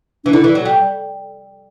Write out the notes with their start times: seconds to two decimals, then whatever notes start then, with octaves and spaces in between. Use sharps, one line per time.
0.25 E3 D4
0.33 D3 E4
0.44 E3
0.55 F#3
0.65 G3